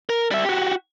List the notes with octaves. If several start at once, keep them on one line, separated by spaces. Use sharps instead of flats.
A#4
G3 E5
F#4 G4